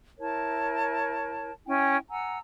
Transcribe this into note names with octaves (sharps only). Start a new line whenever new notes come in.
E4 A#4 C#5 A5
C#4 E4 G5 G#5
F#5 G#5 A#5 E6